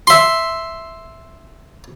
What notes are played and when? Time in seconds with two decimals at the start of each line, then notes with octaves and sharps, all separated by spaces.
0.07 E5 C6